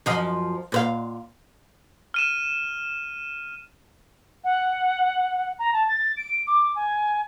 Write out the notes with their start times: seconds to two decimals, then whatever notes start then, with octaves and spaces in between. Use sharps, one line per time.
0.06 F#2 F3 D#5
0.72 A#2 C5 F5
2.14 F6 D#7 E7
4.44 F#5
5.59 A#5
5.73 A5
5.88 A6
6.17 D7
6.47 D6
6.75 G#5